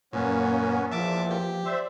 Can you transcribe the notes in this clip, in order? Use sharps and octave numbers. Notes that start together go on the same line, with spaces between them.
F#2 A#2 A#3 B3 C#4
E2 A#2 F3 E5 A5 D6
G4
C5 D5 E5